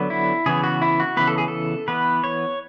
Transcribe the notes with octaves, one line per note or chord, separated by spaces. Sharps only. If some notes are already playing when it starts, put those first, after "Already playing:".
Already playing: D3 F#3 B3
E4
C#3 E3 B3 G#4
F#4
E4
F#4
C#3 E3 B3 B4
A4
G#4
A4
E3 B3 B4
C#5